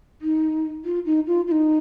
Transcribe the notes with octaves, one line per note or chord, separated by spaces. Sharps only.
D#4
F4
D#4
F4
F4
D#4